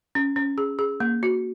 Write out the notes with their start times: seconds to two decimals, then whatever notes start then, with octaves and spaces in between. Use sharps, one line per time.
0.15 C#4
0.36 C#4
0.58 G#4
0.79 G#4
1.00 A#3
1.23 F#4